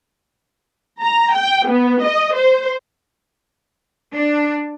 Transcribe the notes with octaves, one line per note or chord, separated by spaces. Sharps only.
A#5
G5
B3
D#5
C5
D4